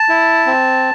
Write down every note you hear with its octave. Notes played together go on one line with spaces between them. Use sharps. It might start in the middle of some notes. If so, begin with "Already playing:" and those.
Already playing: A5
E4
C4